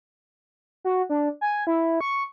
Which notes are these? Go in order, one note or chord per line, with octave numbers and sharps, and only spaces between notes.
F#4
D4
G#5
E4
C#6